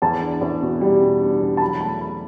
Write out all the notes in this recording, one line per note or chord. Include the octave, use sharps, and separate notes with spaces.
E2 A5
D4
E2
B2
G3
B2
D4
E2
A5
F#3 B5
A3 A5
F#3 B5